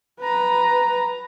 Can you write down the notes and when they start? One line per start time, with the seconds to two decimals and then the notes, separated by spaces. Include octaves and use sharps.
0.19 B4 A#5